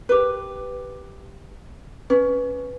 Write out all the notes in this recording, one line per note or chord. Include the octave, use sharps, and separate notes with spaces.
G4 B4
C#4 B4